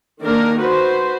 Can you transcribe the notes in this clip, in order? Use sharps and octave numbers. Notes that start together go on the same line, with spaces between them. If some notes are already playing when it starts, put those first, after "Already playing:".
D#3 A#3 D4 A#4
F#4 B4 C5